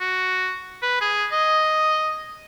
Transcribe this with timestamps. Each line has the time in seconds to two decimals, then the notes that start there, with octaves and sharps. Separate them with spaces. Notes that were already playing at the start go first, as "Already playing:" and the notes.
0.01 F#4
0.82 B4
1.01 G#4
1.32 D#5